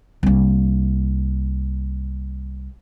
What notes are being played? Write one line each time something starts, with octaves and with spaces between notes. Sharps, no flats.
C2 A#3